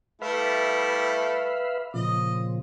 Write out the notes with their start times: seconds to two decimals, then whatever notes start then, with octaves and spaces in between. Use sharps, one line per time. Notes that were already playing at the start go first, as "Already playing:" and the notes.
0.22 G3 A3 E4 B4 E5 F5
1.94 A#2 C#3 F3 D#5